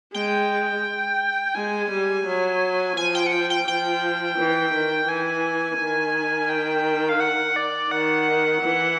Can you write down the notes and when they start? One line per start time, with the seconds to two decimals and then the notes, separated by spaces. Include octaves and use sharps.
0.14 G#3 G5
1.55 G#3 G#5
1.90 G3
2.26 F#3
2.96 F3 G#5
3.15 G5
3.27 F#5
3.32 G5
3.50 G5
3.68 F3 G5
4.38 E3
4.73 D#3
5.08 E3 G#5
5.79 D#3
6.49 G5
7.09 F5
7.20 F#5
7.56 D5
7.91 D#3 F#5
8.61 E3